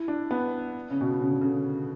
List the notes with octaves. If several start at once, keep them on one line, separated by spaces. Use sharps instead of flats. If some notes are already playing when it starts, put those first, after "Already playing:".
Already playing: E4
D4
B3
C#3
B2
C#3
C#3
D3
C#3